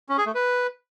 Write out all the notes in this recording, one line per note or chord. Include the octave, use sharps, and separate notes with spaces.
C#4
G#4
A3
B4